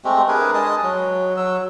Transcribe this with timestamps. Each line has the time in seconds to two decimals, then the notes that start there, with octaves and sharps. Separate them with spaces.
0.05 G#3 A3 C4 G4
0.28 D4 G#4 A#4 B4
0.54 G#3 D#5 A5 D#6
0.83 F#3
1.37 F#3 E6